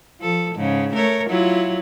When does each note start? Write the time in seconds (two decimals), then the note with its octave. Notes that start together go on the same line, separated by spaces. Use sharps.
0.20 F3 A4
0.55 G#2 C#3
0.94 A3 A#4 C#5
1.29 F#3 E4 F4